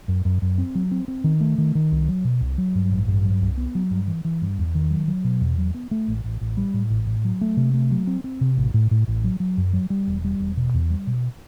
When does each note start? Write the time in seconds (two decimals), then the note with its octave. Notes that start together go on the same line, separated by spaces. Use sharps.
0.08 F#2
0.25 F#2
0.42 F#2
0.58 C4
0.75 F#3
0.92 C4
1.08 C4
1.24 D#3
1.41 A3
1.58 D#3
1.75 D#3
1.92 C2
2.08 F#3
2.25 B2
2.41 C2
2.58 F#3
2.75 G2
2.91 A1
3.08 G2
3.25 F#3
3.41 C2
3.58 B3
3.75 F#3
3.91 G2
4.07 E3
4.25 E3
4.42 G2
4.58 E2
4.75 D#3
4.90 F#3
5.08 F#3
5.24 B2
5.41 E2
5.58 F#3
5.74 B3
5.91 A3
6.08 A1
6.24 A1
6.41 A1
6.57 G3
6.74 A2
6.90 A1
7.07 A2
7.25 F#3
7.41 A3
7.57 C3
7.74 A3
7.91 F#3
8.07 C4
8.24 C4
8.41 C3
8.57 A1
8.74 A2
8.91 A2
9.08 A1
9.24 F#3
9.40 F#3
9.57 F#2
9.73 F#3
9.90 G3
10.07 E1
10.24 G3
10.40 E1
10.57 B2
10.74 E2
10.90 G3
11.07 B2